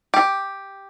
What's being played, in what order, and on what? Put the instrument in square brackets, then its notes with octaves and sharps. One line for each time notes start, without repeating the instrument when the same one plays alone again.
[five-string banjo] G4